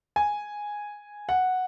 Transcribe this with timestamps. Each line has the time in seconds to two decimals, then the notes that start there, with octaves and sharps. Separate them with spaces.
0.16 G#5
1.29 F#5